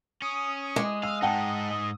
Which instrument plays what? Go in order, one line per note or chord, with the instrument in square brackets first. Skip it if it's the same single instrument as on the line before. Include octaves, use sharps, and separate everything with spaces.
[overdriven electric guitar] C#4 [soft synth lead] D#6
[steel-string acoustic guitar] G#3 [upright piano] D6
[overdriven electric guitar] F5 [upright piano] E6
[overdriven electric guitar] G#2 D#4 [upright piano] F#5 G5 A5